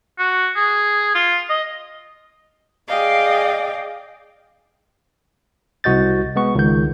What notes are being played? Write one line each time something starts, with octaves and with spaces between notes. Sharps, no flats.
F#4
G#4
F4
D#5
G#4 D5 D#5 F5 G5
C2 F#4 D#5 G6 A6
G#3 B3 C#6
C#2 D#3 G6